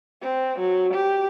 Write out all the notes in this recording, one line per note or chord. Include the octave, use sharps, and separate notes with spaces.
C4
F#3
G4